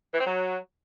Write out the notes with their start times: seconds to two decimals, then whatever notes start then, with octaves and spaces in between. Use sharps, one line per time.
0.14 E3
0.20 C4
0.27 F#3